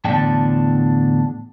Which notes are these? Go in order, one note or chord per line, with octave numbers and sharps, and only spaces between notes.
E2 A2 D3 D4 G5 A5